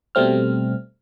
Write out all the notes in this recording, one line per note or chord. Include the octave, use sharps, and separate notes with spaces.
B2 G3 A3 C4 F6